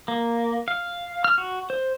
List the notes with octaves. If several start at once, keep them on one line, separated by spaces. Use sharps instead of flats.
A#3
F5
F6
F#4
C5